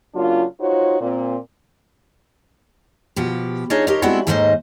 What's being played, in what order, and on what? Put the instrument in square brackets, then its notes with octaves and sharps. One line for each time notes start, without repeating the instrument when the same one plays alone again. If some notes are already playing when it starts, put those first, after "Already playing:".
[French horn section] C#3 F#3 A#3 D4 F4
D#4 F4 F#4 C5 C#5
A#2 C4
[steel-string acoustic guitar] B2 F3 G4
D4 D#4 F4 G#4 C#5 D#5
G4 A#4 C5 C#5 D#5
G#3 B3 C4 D4 E4 F#4
D#2 G#2 D#3 A3 C5 D#5